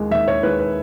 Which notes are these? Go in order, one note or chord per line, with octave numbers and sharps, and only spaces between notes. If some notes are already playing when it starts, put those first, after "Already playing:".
Already playing: D#2 D#3 G#3
D#2 E5
C#5
D#3 G#3 B4
B4